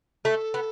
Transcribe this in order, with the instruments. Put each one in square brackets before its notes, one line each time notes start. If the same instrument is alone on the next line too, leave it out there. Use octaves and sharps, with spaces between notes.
[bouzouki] A3 [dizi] A4
[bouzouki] B3